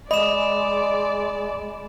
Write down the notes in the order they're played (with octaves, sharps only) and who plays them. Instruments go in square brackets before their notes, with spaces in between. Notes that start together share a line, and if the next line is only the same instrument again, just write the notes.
[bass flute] G#3 [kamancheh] D5 [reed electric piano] D#5 [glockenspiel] B5 E7